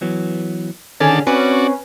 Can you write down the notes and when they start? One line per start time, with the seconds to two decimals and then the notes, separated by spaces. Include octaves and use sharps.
0.01 E3 F#3 B3
1.00 D3 D#3 C#4 G#4 D5 A5
1.27 C4 C#4 F#4 B4 D5